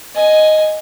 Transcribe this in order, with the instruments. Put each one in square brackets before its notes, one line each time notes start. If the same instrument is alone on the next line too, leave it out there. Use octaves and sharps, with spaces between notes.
[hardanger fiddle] D#5 G#5